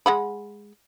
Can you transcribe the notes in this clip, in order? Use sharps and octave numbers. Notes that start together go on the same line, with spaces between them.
G#3 F#5 B5